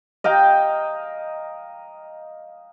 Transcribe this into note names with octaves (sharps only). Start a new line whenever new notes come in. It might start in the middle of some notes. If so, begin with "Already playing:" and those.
D#5 F5 G5 A#5